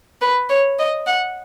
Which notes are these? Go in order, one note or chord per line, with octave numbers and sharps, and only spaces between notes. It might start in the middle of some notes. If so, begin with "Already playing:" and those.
B4
C#5
D#5
F#5